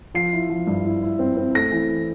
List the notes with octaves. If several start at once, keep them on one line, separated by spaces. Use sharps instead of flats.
F3 C7
E4
F3
G2
E4
E4
C4
C4
A3 A#6
E3